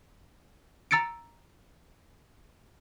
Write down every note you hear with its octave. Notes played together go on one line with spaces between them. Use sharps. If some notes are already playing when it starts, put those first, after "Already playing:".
A#5 E6 A6 C#7 D7